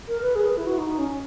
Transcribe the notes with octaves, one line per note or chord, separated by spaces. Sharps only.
A#4
B4
G#4
B4
E4
F#4
D#4
C#4